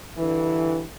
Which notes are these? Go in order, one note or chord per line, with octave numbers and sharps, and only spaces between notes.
G2 D3 E3